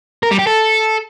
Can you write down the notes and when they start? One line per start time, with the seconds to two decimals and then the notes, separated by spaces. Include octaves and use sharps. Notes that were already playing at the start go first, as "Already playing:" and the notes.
0.23 A#4
0.31 G3
0.39 G4
0.47 A4